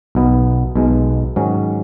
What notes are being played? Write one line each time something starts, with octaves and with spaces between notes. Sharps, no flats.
B1 B2 B3
B1 B2 G#3
G#2 D#3 F#3 C#4